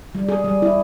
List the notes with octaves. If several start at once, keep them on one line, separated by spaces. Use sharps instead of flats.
G3
G#4
G3
E4